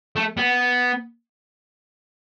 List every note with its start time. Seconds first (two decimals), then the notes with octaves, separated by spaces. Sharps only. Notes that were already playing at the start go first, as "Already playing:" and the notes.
0.16 A3
0.38 B3